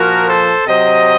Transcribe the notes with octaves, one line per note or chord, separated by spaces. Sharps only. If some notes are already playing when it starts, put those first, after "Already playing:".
Already playing: A#2 F3 F#4 A#4
A4 C5
C3 F#3 C5 D#5